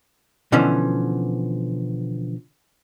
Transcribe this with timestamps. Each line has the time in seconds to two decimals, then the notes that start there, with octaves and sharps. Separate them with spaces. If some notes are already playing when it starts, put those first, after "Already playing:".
0.52 B2 D3 E3 F3 C#4